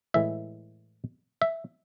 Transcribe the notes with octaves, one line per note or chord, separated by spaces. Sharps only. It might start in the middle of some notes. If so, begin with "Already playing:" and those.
A2 E3 G#3 E5
E5